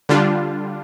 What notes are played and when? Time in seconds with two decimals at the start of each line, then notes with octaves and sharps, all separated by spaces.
0.09 D3 G3 D4 F4